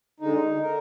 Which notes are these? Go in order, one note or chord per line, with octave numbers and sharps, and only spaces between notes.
D2 D3 G#3 D#4
D3 A#4